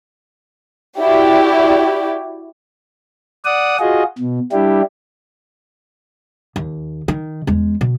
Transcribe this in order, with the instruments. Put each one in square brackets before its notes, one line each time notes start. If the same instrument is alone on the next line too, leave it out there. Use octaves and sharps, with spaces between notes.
[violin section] E4 F#4 G4 D5
[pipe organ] D5 F#5 D#6
F4 F#4 G#4 D#5
B2
G3 D4 E4 G4
[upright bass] D#2
D#3
E2 G#3
B2